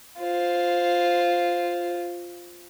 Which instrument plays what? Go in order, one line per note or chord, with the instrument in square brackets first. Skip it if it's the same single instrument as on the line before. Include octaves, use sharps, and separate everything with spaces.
[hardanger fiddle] F4 C5